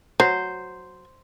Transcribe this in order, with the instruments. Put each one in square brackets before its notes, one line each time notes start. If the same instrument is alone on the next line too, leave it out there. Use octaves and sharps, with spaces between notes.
[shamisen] F#3 [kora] C5